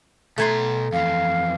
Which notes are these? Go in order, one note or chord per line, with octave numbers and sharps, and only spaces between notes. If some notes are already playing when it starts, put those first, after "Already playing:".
B2 A3 G#5 A#5 C6
F2 E3 F5